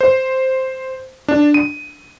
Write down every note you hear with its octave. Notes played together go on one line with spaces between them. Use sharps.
C5
D4
D#7